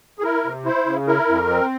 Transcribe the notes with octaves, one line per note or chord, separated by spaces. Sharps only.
G#4
E4 A#4
C3
E4 C5
C#3
E4 A#4
F2
C4